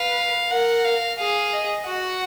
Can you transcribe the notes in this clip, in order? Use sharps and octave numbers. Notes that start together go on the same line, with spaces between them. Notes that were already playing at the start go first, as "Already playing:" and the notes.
Already playing: B4 F5
A#4 F#5
F5
G#4 F5
D#5
F#4 F#5